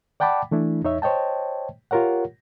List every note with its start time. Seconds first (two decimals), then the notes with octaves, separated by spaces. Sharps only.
0.20 D5 F#5 G5 A5 B5 D6
0.51 E3 A3 D4 E4
0.84 E2 D#4 C#5 E5
1.02 C5 C#5 D#5 G5 A5
1.91 F4 G4 A#4 C#5 F#5